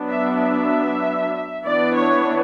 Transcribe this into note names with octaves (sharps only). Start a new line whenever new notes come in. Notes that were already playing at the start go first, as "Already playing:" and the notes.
Already playing: F#3 B3 D4
E5
E5
E3 B3 D4 D5
C#5